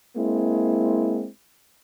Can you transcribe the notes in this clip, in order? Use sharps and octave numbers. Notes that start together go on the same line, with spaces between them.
G#3 A#3 C4 E4